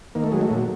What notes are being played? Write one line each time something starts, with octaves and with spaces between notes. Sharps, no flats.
D#3 A#3
A3
F#3 G#3
A3
A#2